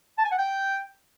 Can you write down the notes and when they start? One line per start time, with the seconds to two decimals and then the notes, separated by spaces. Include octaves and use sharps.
0.18 A5
0.25 G#5
0.32 F#5
0.38 G5